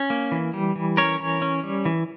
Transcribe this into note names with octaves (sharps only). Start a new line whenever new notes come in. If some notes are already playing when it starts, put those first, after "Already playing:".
Already playing: C#4
A#3
E3
G3
E3
C#4 A#4 C#5
E3
C#4
G3
E3